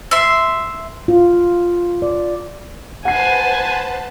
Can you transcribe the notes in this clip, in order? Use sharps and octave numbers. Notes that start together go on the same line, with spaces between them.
E5 C6
F4
D5
B4 C5 F#5 G#5 A5 C7